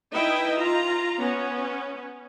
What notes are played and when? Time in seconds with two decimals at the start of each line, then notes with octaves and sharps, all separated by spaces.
0.12 D#4 E4 B4 D#5 E5 G5
0.58 F4 A#5
1.20 B3 C#4